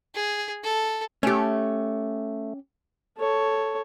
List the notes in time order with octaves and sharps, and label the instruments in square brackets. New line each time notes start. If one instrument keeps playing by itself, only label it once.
[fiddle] G#4
A4
[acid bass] A3 [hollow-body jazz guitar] C#4 G4
[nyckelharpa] A4 C#5